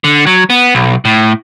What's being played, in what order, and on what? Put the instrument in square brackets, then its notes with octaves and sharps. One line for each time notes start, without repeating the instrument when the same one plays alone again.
[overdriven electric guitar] D3
F#3
B3
B1
A2